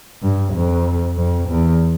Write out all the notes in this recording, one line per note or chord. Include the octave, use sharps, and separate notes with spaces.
G2
F2
F2
E2